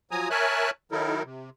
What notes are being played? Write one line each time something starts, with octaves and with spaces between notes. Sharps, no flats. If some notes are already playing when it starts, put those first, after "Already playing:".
F3 F#3 G#5 A#5 D#6
A#4 C#5 E5 G#5 A5 F#6
D#3 F#3 D#4 E4 A4 A#4
C3